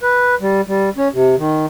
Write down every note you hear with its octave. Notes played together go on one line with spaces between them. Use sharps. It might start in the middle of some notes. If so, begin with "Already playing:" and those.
B4
G3
G3
C#4
C3
D#3